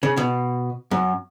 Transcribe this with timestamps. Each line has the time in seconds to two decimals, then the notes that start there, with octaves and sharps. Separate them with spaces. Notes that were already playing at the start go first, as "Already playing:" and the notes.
0.03 C#3
0.17 B2
0.91 F#2